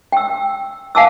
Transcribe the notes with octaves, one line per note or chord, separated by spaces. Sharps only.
G5 E6
F5 F#5 G#5 A5 D6 E6